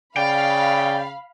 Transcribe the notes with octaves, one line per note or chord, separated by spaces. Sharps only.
C#3 D5 F5 G5 B5